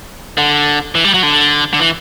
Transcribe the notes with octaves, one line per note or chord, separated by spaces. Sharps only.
D3
E3
G3
F#3
D3
D3
E3